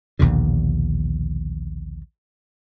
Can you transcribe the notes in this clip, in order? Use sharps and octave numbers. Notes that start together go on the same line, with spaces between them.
A#1 D#2 B2 D3